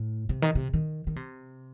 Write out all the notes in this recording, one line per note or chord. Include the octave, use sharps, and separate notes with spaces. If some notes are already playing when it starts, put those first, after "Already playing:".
Already playing: A2
C3
D#3
C3
D#3
D#3
C3